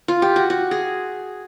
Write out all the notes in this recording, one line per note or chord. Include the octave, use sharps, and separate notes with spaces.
F4
G4
F#4
F#4
G#4